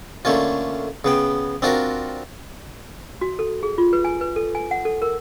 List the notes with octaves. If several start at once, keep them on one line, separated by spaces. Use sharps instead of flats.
D3 A3 A#3 C#4 F4
C#3 B3 G5
C4 D4 F4 F#4 A#4
F#4
A4
G#4
F4
B4
G#5
B4
A4
G#5
F#5
A4
A#4